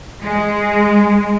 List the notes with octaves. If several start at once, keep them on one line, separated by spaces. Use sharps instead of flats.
G#3